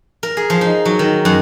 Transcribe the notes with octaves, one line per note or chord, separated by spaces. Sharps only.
A#4
G#4
F3
D#4
F#3
D#3
F#2